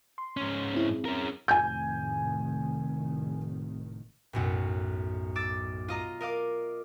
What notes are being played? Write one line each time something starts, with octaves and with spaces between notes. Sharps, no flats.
C6
G#2 C#4
C4 E4 G#4
C#4 A#4
F1 A2 D#3 G#5 G6
B1 F#2 A2
D6 E6 A6
F4 D#5 A#5
A#4 D#5 F5 D6